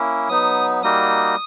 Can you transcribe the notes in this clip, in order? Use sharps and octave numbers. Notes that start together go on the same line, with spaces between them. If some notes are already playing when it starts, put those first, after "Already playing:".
Already playing: A#3 C#4 E4
F#3 B3 D#4 D#6
G3 A#3 D#4 F#4 D#6